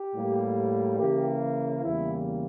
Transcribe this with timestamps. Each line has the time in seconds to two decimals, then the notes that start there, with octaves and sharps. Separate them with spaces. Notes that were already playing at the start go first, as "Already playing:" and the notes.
Already playing: G4
0.14 A2 G3 A#3
0.99 C#3 E3 A#3 G4
1.83 E2 C#3 E3 G3 A#3 E4